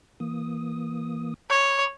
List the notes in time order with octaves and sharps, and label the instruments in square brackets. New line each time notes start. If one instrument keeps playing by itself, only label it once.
[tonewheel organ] E3 A#3 D#6
[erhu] C#5 [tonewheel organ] B5 D6